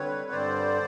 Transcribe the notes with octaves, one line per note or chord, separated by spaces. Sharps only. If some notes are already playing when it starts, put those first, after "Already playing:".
Already playing: D3 G3 C4 B4 C#5
G2 D3 G3 C4 C5 D5